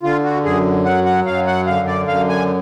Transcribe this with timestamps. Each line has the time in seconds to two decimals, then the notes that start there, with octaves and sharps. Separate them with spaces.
0.03 D3 F4
0.24 F#4
0.44 F#2 G#4
0.85 F#3 F#5
1.06 F#5
1.26 F#2 F5
1.47 F#5
1.67 D3 F5
1.87 D5
2.08 F#2 F5
2.29 G#5